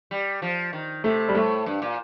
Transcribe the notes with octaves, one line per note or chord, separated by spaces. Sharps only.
G3
F3
D#3
C3 A3
G3
A2 A3
G2
A#2